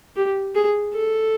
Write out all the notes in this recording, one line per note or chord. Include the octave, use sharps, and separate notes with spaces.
G4
G#4
A4